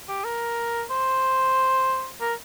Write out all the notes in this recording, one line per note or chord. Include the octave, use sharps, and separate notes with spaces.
G4
A#4
C5
A#4